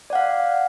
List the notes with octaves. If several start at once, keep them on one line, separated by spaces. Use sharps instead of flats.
D5 F5 F#5